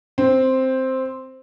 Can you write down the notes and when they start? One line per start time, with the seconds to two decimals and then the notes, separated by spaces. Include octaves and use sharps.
0.18 C4